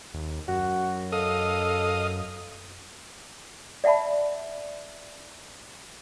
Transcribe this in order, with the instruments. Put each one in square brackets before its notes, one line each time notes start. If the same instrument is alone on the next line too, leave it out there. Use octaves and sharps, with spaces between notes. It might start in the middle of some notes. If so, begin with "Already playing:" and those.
[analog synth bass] D#2
[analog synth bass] F#2 [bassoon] F#4
[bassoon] A4 [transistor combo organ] D#5 F5 D#6
[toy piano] D5 E5 F#5 A5 B5